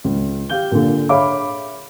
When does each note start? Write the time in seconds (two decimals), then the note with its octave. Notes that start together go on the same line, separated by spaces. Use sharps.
0.04 C#2
0.50 G4 F5 G6 G7
0.72 A#2 D3
1.09 G#4 C#5 E5 F5 B5 D6